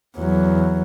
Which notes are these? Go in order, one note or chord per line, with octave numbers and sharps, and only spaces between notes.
E2 F#3